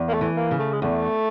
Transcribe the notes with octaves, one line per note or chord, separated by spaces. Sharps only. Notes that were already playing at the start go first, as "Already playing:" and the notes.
Already playing: E2
A#3
A3
E3
A#3
C#3
A3
G#3
E2 A3